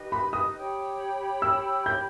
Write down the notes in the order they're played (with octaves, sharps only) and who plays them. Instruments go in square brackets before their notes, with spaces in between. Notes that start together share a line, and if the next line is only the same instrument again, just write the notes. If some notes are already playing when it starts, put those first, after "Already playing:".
Already playing: [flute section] D#4 G4 B4 D#5
[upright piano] B5
D#6
[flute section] G4 C#5 G5 B5
[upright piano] E6
G6